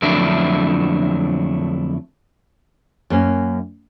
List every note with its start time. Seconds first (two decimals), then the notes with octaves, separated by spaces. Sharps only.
0.02 F2 D3 F#3 A3 D4 E4
3.10 F#2 A#3 C#4